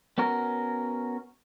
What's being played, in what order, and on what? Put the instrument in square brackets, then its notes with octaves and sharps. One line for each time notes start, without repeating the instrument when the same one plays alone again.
[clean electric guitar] B3 C#4 F#4 A#4